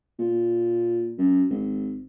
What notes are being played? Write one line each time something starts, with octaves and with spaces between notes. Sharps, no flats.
A#2
F#2
G#1